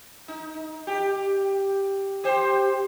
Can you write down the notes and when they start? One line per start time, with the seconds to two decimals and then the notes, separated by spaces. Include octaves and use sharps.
0.28 D#4
0.87 G4
2.24 G4 C5